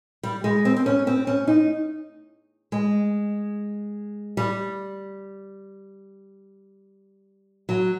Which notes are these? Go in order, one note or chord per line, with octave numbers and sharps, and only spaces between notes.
G3
G#3
C4
C4
C#4
C4
C#4
D#4
G#3
G3
F#3